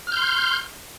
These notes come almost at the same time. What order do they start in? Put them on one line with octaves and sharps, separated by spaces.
F6 G6 C6